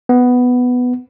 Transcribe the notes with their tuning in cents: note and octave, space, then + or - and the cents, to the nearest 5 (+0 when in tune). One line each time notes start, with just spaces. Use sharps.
B3 +5